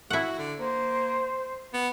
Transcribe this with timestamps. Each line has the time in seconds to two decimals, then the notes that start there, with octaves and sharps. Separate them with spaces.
0.11 E4 F#4 F#5
0.38 D3
0.59 A#3 C5
1.73 B3